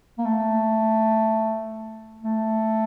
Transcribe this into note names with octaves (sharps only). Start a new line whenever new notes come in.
A#3
A3
A3